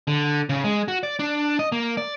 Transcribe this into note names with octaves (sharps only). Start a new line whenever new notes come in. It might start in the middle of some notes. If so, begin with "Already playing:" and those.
D3
C#3
G#3
F#4
D5
D4
D#5
A#3
D5